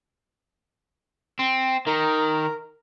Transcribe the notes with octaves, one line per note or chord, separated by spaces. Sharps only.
C4
D#3 A#4